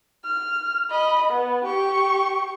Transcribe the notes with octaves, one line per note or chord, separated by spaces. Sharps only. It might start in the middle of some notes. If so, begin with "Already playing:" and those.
F6
D#5 B5
B3
G4 C#6